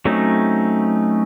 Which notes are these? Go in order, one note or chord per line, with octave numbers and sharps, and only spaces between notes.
F#3 A3 C4 C#4 D#4